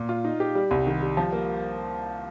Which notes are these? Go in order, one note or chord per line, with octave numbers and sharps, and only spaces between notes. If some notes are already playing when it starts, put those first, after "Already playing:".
Already playing: A#2
F4
D#4
G4
G3
C2
D#3
G3
F3
A#3